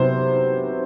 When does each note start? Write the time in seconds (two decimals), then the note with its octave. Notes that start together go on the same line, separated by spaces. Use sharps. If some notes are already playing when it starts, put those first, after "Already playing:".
Already playing: C3 F#3 B3 C5